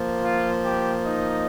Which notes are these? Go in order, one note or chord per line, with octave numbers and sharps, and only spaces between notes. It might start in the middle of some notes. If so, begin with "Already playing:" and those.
Already playing: F3 A#3
F4
G4
D#4 D#5